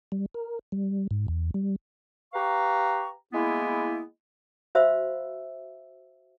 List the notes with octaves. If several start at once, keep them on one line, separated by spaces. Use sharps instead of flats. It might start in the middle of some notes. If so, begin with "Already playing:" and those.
G3
A#4
G3
G#2
E2
G3
G4 B4 F5 A#5 C#6
G#3 A#3 B3 E4
F#4 C5 E5 F5 B5 E6